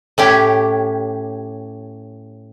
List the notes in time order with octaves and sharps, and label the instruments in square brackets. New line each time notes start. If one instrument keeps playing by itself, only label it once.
[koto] A2 C#4 G4